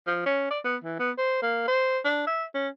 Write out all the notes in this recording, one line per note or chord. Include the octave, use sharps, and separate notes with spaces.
F3
C#4
D5
B3
E3
B3
C5
A#3
C5
D4
E5
C#4